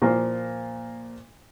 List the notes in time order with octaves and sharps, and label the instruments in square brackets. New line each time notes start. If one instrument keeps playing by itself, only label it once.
[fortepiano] A#2 F3 A#3 F4